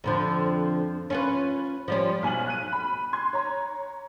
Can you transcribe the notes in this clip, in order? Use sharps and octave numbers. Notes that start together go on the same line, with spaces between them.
F2 D3 F3
C#4 F4 B4
F3 G3 C#4
B1 G#5 F6 F#7
F#6 D#7
B5
C6 G#6
C#5 A#5